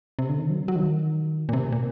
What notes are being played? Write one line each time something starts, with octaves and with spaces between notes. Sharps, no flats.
C3
D3
D#3
F#3
F#3
D#3
A#2
C3
A#2